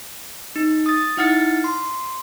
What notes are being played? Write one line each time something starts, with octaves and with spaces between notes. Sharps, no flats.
D#4
D#6 A6
D#4 E4 F#5 F6 A6 C#7
C6